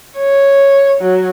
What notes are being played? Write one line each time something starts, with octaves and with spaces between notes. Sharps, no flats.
C#5
F#3